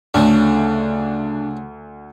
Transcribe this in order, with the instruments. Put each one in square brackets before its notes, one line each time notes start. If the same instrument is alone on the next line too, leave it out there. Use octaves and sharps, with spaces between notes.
[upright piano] D2 [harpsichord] C#3 A3 [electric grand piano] D4